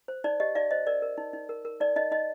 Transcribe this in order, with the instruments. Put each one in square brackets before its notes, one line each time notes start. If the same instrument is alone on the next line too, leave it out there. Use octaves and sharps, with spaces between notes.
[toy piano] C5
D#4 D5
G4 D#5
D#4 D5 F5
C5 D#5
A#4 D5
A#4
D#4
D#4
A#4
A#4
D#4 D5
D#4 D#5
D#4 D#5